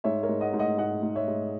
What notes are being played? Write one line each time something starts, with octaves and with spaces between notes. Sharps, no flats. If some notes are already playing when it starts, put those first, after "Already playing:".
G#2 C#5 E5
A#4 C#5
G#2
D#5 F#5
G#2
D#5 F#5
G#2 D#5 F#5
G#2
C#5 E5
G#2